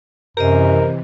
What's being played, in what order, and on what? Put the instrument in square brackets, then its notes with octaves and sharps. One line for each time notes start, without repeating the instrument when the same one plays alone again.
[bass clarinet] F#2 [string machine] C3 E3 [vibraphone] G4 C5 D#5 [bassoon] A#4